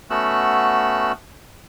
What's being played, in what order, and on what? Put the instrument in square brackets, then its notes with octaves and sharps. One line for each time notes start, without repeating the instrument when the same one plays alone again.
[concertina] A3 B3 C#4 F#4 E6 F#6